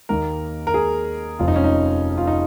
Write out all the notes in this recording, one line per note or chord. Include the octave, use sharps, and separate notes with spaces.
D#2 D#3 A#3 A#4
A#4
G#4
F1 F2 F3 F4
D#4
C#4
D#4
F4
D#4